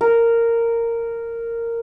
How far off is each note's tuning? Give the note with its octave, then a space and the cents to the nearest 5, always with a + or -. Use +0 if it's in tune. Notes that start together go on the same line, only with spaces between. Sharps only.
A#4 -10